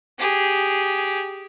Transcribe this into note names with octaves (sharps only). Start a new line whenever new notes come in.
G4 G#4